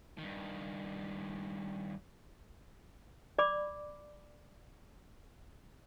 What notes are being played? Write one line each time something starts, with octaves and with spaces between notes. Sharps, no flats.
G2 D#3
D5 B5 D6